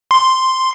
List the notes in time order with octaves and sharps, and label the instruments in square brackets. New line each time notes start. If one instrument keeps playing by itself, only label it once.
[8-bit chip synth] C6